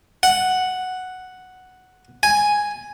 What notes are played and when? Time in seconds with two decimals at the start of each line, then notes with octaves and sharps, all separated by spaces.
0.23 F#5
2.23 G#5